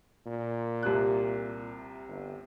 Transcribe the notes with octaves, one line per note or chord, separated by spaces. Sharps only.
A#2
C2 C3 F#6
G1